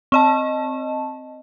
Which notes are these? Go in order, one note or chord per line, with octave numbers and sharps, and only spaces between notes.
C4 D#5 A5